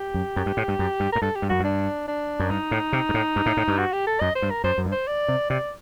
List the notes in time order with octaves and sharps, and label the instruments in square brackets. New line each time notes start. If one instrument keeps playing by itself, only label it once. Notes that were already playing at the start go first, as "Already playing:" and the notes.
Already playing: [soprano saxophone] G4
[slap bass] F#2
F#2
G2
A2
G2
F#2
G2
[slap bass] A2 [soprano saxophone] A#4
[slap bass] G2 [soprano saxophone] A4
[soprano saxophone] G4
[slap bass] G2
[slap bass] F#2 [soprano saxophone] F#4
[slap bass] G2 [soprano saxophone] D4
[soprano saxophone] D4
[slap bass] F#2
[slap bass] G2 [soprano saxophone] D#4
[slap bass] A2
C3
G2
A2
G2
A2
A2
G2
[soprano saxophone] F#4
G4
A4
[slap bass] F#2 [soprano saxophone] D#5
[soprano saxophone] C5
[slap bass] G2
[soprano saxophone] A#4
[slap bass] F#2 [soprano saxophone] C5
[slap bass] F#2
G2
[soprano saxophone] C5
D5
[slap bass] C3
[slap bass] C3 [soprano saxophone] D5